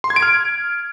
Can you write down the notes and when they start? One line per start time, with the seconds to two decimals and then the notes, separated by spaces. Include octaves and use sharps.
0.04 C6
0.10 G#6
0.16 D7
0.22 F6